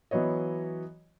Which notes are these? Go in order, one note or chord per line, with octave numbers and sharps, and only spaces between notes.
E3 F#3 B3 C#5 D#5